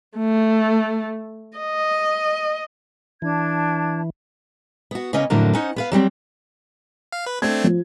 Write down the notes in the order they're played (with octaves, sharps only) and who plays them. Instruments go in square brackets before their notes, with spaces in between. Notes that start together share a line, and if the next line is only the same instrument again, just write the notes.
[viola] A3
D#5
[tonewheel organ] E3 [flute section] D4 A5 G#6
[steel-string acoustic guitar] B3 F#4
C#3 A#3 B3 C#4 D#5
F2 A2 D3 F#3 A#3 D4
C#4 D#4 C5 F#5
B3 B4 F5
F#3 G3 C4 G4
[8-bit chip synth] F5
B4
[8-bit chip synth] A3 C4 D4 [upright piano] G#6
[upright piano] F3